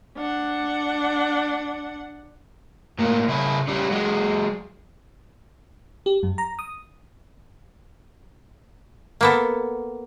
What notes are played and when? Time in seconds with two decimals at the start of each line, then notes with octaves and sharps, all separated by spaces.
0.17 D4 F#5
2.98 A2 A#3
3.28 C#3 E4
3.67 C#3 G3
3.91 F#3 G#3
6.06 G4
6.23 F#2
6.38 A#5
6.59 D#6
9.21 A#3 B3 A4